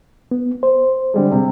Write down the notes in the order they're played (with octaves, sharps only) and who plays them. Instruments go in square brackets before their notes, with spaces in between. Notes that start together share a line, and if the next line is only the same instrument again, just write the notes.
[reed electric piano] B3
C5
[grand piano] D3 G3 G#3
C3